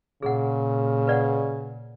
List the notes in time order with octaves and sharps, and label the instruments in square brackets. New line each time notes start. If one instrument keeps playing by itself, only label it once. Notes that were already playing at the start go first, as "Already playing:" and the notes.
[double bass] A#2 [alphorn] C#3 [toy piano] G#4 F#5
[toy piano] B4 D5 F#5